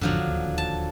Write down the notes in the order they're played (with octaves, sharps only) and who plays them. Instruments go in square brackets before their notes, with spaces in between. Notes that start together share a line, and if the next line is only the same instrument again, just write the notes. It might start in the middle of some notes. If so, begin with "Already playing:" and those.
[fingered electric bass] A1 F2 G#2 [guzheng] D3 F3 F#3
[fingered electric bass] D1 D#2
[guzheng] A5